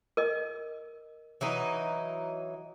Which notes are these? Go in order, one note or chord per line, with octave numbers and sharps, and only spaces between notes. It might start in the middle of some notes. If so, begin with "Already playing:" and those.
A#4 D#5
E3 F#3 D#4